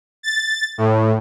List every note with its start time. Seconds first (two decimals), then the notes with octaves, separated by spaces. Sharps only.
0.23 A6
0.78 A2